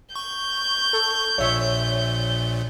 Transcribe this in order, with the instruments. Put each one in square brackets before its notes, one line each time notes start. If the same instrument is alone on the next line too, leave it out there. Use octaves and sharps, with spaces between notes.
[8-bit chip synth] C#6 [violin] G6
[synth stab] A4
[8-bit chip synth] A#1 A#2 [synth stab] C#5 E5